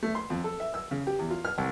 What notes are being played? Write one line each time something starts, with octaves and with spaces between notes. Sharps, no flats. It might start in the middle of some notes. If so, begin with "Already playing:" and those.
A3
C6
F2
A4
E5
E6
C#3
G4
E2
F4
F6
C2